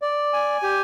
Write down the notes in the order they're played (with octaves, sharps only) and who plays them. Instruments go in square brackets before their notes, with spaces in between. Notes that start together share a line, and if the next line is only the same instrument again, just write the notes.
[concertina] D5
G#5
G4